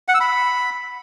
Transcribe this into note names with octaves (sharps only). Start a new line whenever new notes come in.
F#5
E6
B5